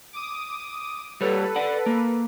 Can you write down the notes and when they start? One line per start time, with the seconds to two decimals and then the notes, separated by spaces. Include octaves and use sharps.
0.13 D6 D#6
1.21 G3 A4 B4 C#5
1.56 D5 F#5
1.86 A#3